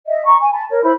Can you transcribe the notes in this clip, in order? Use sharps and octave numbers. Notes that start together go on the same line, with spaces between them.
D#5 E5
A#5 C#6
G#5
A5 B5
A#4 C#5
E4 C5 B5